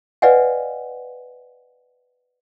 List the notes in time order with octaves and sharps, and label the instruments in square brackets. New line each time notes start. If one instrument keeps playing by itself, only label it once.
[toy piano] B4 D5 D#5 F5 F#5 G#5